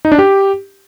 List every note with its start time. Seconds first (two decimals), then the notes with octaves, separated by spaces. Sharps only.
0.05 D#4
0.12 D4
0.19 G4